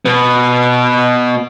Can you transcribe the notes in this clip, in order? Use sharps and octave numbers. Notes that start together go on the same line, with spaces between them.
B2 B3